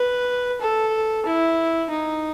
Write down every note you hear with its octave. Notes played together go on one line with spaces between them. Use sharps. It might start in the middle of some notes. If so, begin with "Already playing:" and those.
Already playing: B4
A4
E4
D#4